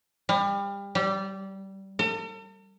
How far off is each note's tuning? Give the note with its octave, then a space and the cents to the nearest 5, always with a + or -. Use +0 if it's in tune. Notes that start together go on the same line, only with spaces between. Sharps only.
G3 +30
G3 -20
A4 +45